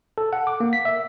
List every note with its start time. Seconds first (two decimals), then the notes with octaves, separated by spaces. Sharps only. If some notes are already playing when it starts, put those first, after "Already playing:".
0.18 A4
0.33 F#5
0.47 D6
0.60 A#3
0.73 B6
0.85 E5